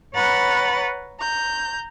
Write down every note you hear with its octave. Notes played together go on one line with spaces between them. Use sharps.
B4 C#5 F#5 A#5 B5 A6
A#5 G6